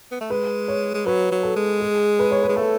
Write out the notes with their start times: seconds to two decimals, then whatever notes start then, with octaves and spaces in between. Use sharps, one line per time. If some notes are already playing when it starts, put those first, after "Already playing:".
0.11 B3
0.21 A3
0.30 G#3 B4
0.68 C#5
0.94 G#3
1.05 F#3 B4
1.31 F#3
1.43 A4
1.56 G#3
1.81 G#4
2.19 B4
2.31 C#5
2.43 B4
2.49 G#3
2.56 A3 A4